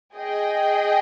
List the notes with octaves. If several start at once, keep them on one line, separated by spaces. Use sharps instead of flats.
G#4 D#5 G5